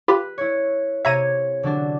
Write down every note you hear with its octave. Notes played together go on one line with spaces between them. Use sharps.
F4 G4 B4 B5
E4 C#5
C3 C#5 E5 A#5 G#6 D#7
D3 F#3 D4